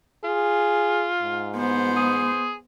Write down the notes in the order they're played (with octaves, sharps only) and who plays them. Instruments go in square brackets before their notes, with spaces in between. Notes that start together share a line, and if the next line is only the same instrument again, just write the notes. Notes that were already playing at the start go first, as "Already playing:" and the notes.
[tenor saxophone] F4 [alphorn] G#4
[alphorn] G#2
[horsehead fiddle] B3 C5
[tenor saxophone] G#4